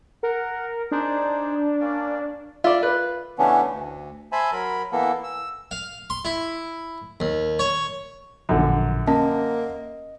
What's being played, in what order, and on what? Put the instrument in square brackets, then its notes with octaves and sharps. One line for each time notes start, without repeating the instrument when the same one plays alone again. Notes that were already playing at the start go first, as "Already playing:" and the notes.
[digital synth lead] A#4 [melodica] F#5
[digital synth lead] D4 [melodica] D#4 G#4 C5
[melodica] A#3 C#4 D5
[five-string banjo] F4 [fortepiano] D5 E5
[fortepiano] B4
[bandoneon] C#3 E3 A3 B3 C#4 D4
D2
C5 E5 G#5 A5 B5
F#3 A#4 B5
E3 A#3 B3 A4
E6
[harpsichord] F5
C6
E4
D#2
C#5
[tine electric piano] A1 A#2 F3 [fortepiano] F#2 D3
[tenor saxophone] A#3 [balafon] C#4 [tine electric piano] D#5